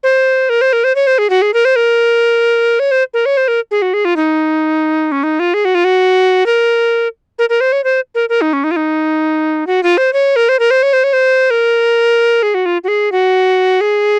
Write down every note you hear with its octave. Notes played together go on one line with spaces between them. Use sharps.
C5
A#4
C5
A#4
C5
C#5
C5
G#4
F#4
G#4
A#4
C5
A#4
C#5
C5
A#4
C#5
C5
A#4
G#4
F#4
G#4
F4
D#4
C#4
D#4
F4
G#4
F#4
F4
F#4
A#4
A#4
A#4
C5
C#5
C5
A#4
A#4
D#4
C#4
D#4
F4
D#4
F#4
F4
C5
C#5
A#4
C5
A#4
C5
C#5
C5
C#5
C5
A#4
G#4
F#4
F4
F#4
G#4
F#4
G#4